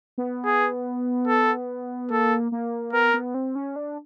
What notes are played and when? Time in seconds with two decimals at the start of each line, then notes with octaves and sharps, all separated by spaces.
0.18 B3
0.45 G#4
1.28 A4
2.11 A#3 A4
2.52 A#3
2.93 B3 A#4
3.14 B3
3.34 C4
3.55 C#4
3.76 D4